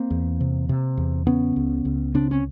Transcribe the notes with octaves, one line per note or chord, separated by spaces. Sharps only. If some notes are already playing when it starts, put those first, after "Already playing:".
Already playing: A#3 C4
E2
C3
C3
E2
C#3 B3 C#4
C#2
C#2
C#3 C4 D4
C#4